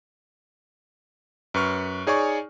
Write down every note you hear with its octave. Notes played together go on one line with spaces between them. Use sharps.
F#2 B4 C#6 F6
D#4 G#4 C#5 D5 G#5 C#6